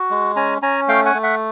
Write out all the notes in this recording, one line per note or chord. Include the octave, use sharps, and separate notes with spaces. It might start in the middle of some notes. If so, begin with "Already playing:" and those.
Already playing: F#4
G#3
C#4 G#5 A#5
C#4 G#5 A#5
A3 F5 G5
F#5 G#5
A3
E5 F#5